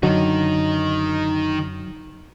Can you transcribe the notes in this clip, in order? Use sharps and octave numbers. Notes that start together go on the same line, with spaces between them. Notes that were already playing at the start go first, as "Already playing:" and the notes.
F#2 D3 D#3 F#3 D#4